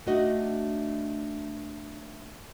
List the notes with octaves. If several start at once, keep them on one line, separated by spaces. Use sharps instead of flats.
A3 D4 D#4 F#4 D#5